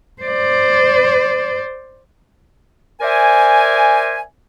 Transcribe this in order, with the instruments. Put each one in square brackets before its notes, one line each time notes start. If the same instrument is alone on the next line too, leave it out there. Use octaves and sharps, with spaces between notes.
[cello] C5 D5
[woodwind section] A#4 C5 D5 E5 G#5